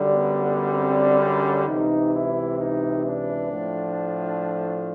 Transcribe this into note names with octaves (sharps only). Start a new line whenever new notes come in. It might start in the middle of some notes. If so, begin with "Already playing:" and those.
Already playing: F#2 D3 G3
B3
B3
C4
C#4
C#2 C3 E3 D#4
E4
D#4
D4
A2 F3 A3